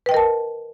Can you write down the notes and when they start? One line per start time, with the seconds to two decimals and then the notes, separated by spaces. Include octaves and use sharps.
0.06 B4
0.09 G5
0.11 D#5
0.14 A#4
0.17 A5